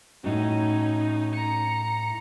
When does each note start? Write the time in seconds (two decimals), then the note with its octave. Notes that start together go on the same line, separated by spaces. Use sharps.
0.24 A2 C#4 D#4 F#4
1.35 A#5 C#7